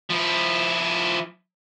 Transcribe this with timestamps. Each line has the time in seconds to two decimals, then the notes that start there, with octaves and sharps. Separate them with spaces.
0.10 F3 E4